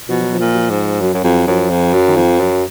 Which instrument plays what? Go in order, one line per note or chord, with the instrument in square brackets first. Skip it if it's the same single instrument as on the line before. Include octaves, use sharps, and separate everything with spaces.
[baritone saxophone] B2 [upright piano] F3
[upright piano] F#3
F3
[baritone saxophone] A#2
[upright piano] F3
[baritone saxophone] G#2
[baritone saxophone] F#2 [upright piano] F#3
[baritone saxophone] F#2
F2
[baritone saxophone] F#2 [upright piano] F3
[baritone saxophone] F2
[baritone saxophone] F#2 [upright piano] F#3
[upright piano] D#3
[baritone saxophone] F2 [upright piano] F3
[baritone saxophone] F#2 [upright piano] F#3